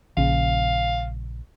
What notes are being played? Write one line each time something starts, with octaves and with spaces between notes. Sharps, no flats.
A#1 C#3 C#4 F5